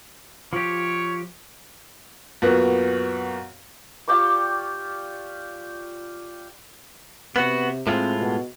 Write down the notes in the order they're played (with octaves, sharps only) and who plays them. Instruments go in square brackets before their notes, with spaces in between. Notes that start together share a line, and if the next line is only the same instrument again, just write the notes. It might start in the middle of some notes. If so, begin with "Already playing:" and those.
[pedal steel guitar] F3 G4 [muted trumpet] C#5
[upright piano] F#2 A#2 A#3 B3 F#4
[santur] F4 G4 D5 C#6
[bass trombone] C3 [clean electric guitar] B3 F#4
[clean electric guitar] A2 G#3 F4 [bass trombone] C4
[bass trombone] B2